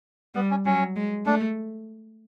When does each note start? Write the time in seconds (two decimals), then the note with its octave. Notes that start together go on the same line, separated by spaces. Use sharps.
0.35 G3 B3
0.51 C#4
0.65 F#3 C#4
0.96 G#3
1.25 A3 D4